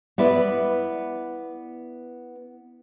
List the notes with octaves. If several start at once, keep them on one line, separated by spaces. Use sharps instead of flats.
B3 E4 B4 D5